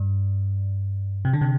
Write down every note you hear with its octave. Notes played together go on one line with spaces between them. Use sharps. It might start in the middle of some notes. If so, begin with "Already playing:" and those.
Already playing: G2
C3
D3
C3